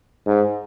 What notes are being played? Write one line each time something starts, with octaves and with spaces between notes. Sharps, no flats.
G#2